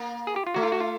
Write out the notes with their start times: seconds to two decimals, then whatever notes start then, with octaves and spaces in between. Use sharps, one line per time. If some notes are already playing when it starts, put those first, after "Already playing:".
Already playing: A#3
0.27 G#4
0.36 G4
0.47 F4
0.54 A3 F#4
0.63 F4
0.72 F#4
0.80 F4